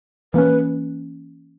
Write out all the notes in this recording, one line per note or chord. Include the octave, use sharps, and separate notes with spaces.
E3 A#3 C#4 B4